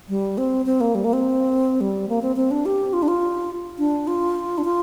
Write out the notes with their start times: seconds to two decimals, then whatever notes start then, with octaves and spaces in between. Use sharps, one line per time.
0.09 G3
0.38 C4
0.66 C4
0.81 A#3
0.95 G3
1.05 A#3
1.13 C4
1.81 G3
2.09 A#3
2.22 C4
2.36 C4
2.51 D4
2.66 G4
2.93 F4
3.03 D4
3.08 F4
3.79 D4
4.07 F4
4.58 D4
4.64 F4